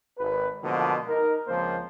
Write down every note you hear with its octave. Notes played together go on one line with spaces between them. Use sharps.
G#1 B4
B2 D3 F3 G#3 A#3
D#4 A#4
C#2 F3 A#3 C4 C5